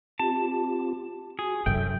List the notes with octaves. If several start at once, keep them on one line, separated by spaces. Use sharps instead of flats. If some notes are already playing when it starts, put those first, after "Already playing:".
C4 F4 G4 A5
F#4 G#4
F#2 C3 A4 E5 G5